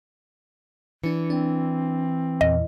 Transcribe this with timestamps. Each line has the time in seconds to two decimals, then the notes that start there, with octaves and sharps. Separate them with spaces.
1.04 E3 D4 C#7
1.30 C4 D4
2.41 E2 A#2 D#5